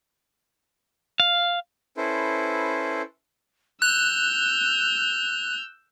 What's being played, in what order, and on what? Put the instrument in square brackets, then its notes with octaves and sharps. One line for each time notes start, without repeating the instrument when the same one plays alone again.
[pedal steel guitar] F5
[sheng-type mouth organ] C#4 E4 A4 B4 C5
[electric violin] E6 G6 [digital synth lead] F#6 [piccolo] F7